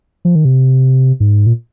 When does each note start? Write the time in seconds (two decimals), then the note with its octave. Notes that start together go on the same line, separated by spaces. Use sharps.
0.25 F3
0.35 D#3
0.45 C3
1.20 G#2
1.46 A#2